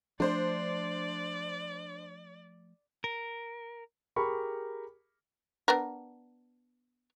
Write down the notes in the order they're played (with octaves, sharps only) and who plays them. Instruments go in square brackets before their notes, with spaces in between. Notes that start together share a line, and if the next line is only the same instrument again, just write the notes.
[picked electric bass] F3 A3 [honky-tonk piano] D4 C5 [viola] D5
[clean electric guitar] A#4
[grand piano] G4 G#4 A#4 B5 C#6
[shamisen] B3 D4 A#4